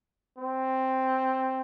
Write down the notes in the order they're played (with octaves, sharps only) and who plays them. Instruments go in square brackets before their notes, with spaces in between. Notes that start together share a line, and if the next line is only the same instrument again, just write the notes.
[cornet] C4